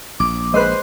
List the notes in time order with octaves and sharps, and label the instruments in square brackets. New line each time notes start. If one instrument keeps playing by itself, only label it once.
[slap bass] A#1 [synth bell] D6
[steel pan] G#3 B4 [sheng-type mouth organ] C5 [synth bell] D#5 C6 F#6